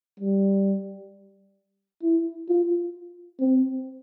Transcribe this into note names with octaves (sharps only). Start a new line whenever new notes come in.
G3
E4
F4
C4